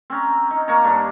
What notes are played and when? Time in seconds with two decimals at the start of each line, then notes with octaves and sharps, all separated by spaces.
0.10 C4 C#4 A#5
0.51 D#4
0.68 A#3 C#5 A#5
0.84 G2 D4